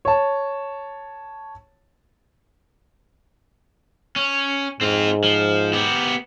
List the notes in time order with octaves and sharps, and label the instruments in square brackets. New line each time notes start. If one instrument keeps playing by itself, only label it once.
[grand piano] C#5 A5
[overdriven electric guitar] C#4
[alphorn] G#2 [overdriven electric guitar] C4 F4
[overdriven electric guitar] F3
B3 G4